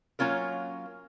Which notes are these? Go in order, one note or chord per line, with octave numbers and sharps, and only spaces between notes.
F#3 A#3 C#4 F4 A#4